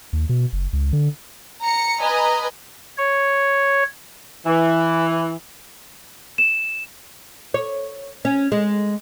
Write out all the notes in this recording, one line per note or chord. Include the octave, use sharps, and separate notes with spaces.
D#2
B2
F#1
C#2
D3
A#5 C#7
B4 D#5 G#5 A#5
C#5
E3
E7
C#5
C#4
G#3